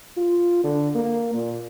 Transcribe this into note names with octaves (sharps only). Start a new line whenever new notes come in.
F4
D3
A#3
A#2